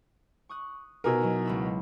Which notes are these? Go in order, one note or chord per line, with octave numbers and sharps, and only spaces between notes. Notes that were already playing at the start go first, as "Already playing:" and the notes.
C#6 D#6 F#6
B2 D#4 A#4 G#5 E6
F#3 B3 E4
C#2 B5 E6